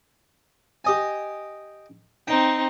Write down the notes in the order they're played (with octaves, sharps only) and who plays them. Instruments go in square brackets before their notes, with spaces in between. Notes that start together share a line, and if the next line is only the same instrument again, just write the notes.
[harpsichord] G4 D#5 G#5
[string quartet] C4 D#4 [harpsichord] G5